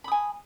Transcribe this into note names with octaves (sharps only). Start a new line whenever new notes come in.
G#5 B5 D#6